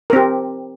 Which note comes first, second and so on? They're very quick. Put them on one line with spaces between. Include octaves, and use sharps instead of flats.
A#4 C4 G4